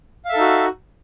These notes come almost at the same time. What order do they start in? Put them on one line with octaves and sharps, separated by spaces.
F5 E5 A4 D#4 F#4